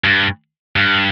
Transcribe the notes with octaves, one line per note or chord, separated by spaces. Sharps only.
G2
G2